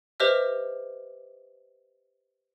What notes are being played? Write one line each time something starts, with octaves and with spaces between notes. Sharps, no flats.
G4 B4 C5 D#5 E5 F6